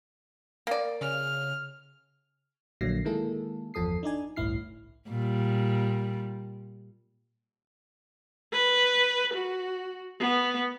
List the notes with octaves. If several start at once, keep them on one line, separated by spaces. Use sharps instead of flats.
A#3 D5
C#3 F6
A#1 D3 F#3 A#3 A#6 C7
D#3 G#3 A#3 E4 G#4 A4
G1 E2 F3 A4 D#6 C7
D4 D#4 D5 G#5
G1 C2 A2 E4 F6 C7
A#2 G3
B4
F#4
B3